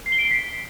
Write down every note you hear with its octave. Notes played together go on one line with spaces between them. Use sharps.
C7
G7
D7
C7
B6